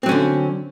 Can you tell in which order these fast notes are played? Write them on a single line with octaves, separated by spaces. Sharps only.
C4 F#3 C#4 D3